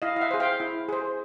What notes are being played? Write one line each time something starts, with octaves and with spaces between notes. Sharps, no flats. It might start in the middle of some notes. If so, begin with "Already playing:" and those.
E4 D#5 F5
F5
E5 F#5
G#4 C5
F5 G5
E4
G#4 C5